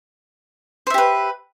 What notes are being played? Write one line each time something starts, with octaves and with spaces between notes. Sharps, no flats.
G4 B4 C5 E5